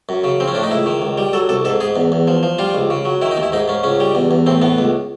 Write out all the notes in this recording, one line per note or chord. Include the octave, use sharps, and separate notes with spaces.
F#2
C#3
F3 C4
C#4
A2 D4
D#4
C#2 E4
D#3
C#2
G3
F#3 A4
C2 A4
G#2 A4
G#2 G#4
E2
E2
F3
F3
G3 F4
C#2
C#3
F#3
D#3 E4
D#4
D#2
E4
G#2 D#4
G#2 C#4
C#2 C#4
G3
E2
E2
A2 C4
A2 B3
C#2